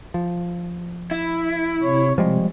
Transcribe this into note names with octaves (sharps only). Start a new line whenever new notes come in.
F3
E4
C3 C#5
C3 F3 G3 G#3